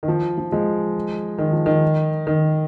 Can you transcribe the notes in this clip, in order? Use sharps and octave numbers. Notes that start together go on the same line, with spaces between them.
D#3
F3
F3
F3 G#3
D#3
F3
D#3
D#3